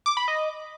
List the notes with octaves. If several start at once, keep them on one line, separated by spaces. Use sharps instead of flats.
D6
B5
D#5